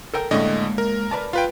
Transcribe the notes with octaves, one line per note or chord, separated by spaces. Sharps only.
A4 A#4 G5
A2 D3 G#3 A#3 C#4 D#5
A#4
B4 D5 A5
F4 B4 F5 G5